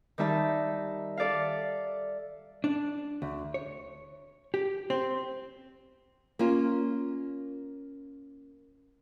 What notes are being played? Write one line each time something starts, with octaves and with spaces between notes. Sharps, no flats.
D#3 G3 D#4 E5 A5
A4 D5 E5 F5
D4
D2
C#5
G4
C4
A#3 C#4 F4